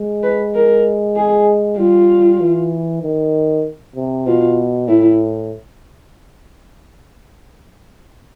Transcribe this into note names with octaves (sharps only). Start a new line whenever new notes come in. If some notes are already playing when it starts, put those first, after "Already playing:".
Already playing: G#3
B4
A#4
G#4
G3 F4
E3
D#3
C3
B2 F4
A2 E4